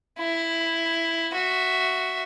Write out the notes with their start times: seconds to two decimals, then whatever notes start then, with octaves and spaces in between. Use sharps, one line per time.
0.19 E4
1.32 F#4 E5